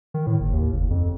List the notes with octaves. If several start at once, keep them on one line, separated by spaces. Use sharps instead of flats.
D#3
A2
F#1
D#2
F#1
F2